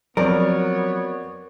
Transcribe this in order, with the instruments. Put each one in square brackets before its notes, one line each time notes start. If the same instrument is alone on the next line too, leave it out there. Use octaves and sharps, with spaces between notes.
[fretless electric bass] F3 F#3 [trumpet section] B3 C#5 [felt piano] C4 D5 [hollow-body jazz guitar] A#4